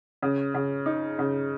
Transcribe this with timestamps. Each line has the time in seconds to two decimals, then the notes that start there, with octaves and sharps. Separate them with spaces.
0.22 C#3
0.54 C#3
0.86 D#4
1.19 C#3